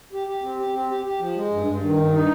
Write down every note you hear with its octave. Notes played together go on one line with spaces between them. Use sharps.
G4
G4
C4
G4
C4
G4
G4
F3
G#3
G2
G2
D#3
G2
D#4